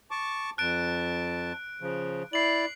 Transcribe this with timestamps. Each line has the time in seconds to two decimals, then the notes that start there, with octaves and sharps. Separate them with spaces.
0.11 A5 C#6 D6
0.58 F2 A5 F#6 D7
1.81 C#3 F3
2.33 E4 D5 C7 F#7